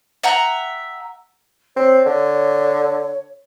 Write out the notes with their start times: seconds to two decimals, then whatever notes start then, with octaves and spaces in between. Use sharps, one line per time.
0.23 E5 F#5 G5 A#5
1.76 C4 C#5
2.06 D3